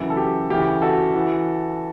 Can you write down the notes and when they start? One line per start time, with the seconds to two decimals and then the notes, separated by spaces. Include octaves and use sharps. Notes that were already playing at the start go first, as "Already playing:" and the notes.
Already playing: F#2 C#3 E3 F#4 A4
0.10 A4
0.17 G4
0.50 D2 C#3 E3 G4
0.82 F#4 A4
1.14 E3